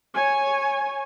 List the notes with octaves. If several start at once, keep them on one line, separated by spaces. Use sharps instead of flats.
C#5 G#5